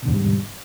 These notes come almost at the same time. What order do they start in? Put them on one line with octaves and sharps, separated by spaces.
B2 D3 E2 G#2 G3